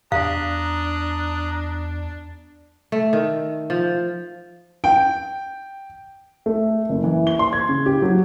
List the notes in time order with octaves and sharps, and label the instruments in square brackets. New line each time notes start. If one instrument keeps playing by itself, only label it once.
[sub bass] E2 [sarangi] D4 [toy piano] F5 [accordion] A#5 D#6 F#6
[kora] A3
D#3
F3
[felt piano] G5
[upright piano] A3
F#1
E3
G7
C6
G#6
C#3
G4
F#3